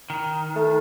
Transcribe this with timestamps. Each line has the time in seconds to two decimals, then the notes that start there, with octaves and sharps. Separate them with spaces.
0.10 D#3
0.56 A3